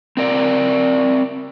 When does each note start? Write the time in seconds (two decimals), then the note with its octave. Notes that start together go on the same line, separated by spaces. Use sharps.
0.17 C4 A#4 D5